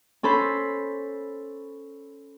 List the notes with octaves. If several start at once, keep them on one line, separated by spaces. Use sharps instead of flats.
C#4 A4 C5 B5